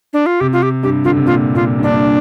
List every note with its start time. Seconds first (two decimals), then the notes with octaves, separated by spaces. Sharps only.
0.13 D4
0.26 F4
0.40 C3 G4
0.53 F4
0.62 G4
0.83 G2 G4
1.04 D3 F4
1.17 C3
1.26 A#2 F4
1.54 A#2 F4
1.79 G2
1.83 A#2 D4